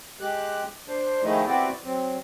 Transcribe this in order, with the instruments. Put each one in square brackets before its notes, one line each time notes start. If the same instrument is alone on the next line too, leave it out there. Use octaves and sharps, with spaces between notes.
[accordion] G#3 G4 F#6
D4 C5
D#3 F3 G#3 A3 D#4 E4
B3 C4 E4 F#4 G4 D5
F#3 C4